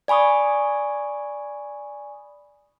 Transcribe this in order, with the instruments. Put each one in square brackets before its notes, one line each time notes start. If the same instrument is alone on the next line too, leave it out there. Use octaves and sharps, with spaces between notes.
[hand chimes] D5 G#5 B5 C#6 D#6